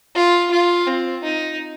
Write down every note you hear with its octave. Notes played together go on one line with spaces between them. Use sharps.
F4
F4
C4
D#4